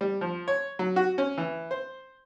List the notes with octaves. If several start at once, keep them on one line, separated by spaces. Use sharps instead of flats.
G3
F3
C#5
F#3
F#4
C#4
E3
C5